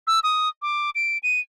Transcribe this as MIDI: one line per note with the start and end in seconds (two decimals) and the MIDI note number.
0.07 0.20 88
0.23 0.49 87
0.62 0.90 86
0.95 1.18 98
1.23 1.40 99